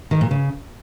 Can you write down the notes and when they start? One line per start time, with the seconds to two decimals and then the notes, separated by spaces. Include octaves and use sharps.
0.11 D#3
0.21 A#2
0.31 C#3